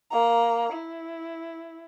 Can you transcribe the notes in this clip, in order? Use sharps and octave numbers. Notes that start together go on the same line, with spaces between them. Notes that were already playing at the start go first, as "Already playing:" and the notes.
A#3 A#5
E4